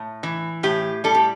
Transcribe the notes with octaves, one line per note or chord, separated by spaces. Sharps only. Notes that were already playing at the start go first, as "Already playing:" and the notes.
Already playing: A2
E3
A2 G4
G3 A4
G4